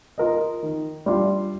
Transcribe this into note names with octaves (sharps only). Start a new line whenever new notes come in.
F4 A#4 D#5
D#3
G3 D4 F4